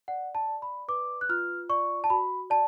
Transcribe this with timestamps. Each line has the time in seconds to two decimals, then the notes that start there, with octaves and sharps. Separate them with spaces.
0.08 D5 F#5
0.35 A5
0.48 D5
0.62 B5
0.88 B4 D6
1.21 F#6
1.29 F4 F6
1.69 D5 C#6
2.04 A5
2.10 F#4 B5
2.50 D5 A5